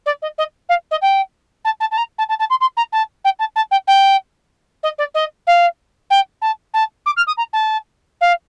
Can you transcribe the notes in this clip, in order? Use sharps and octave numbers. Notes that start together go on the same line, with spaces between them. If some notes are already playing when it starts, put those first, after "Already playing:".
D5
D#5
D#5
F5
D#5
G5
A5
A5
A5
A#5
A5
A5
A5
C6
C6
A#5
A5
G5
A5
A5
G5
G5
D#5
D5
D#5
F5
G5
A5
A5
D6
F6
D#6
A#5
A5
F5